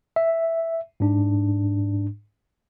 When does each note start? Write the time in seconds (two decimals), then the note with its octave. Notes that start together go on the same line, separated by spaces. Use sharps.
0.16 E5
1.00 G#2 D4